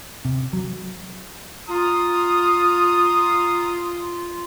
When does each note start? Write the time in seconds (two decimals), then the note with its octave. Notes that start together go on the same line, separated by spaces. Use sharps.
0.25 C3
0.53 F#3
1.68 F4 A#5 D#6